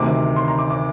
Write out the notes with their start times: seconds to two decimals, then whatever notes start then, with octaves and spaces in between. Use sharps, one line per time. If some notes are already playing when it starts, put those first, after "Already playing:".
Already playing: D2 C3 D#3 D6
0.36 C6
0.48 A#5
0.59 D6
0.70 D6